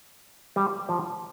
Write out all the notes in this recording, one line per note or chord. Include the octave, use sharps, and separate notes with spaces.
G3
F3